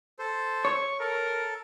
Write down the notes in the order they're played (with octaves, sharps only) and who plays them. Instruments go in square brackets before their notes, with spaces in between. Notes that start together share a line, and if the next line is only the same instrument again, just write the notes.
[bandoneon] A4 C5
[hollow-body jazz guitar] C#5 [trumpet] C#6
[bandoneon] A4 [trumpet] A#4